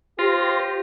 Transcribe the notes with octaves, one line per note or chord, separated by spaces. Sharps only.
F4 G4 C5 C6 A#6